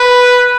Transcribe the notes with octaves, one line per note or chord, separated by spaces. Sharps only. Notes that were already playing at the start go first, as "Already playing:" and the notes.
Already playing: B4